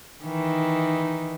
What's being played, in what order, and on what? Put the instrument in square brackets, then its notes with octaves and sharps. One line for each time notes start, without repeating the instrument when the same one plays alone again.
[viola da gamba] D#3 E3 D#4